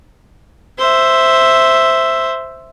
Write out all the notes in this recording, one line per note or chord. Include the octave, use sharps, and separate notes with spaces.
C5 E5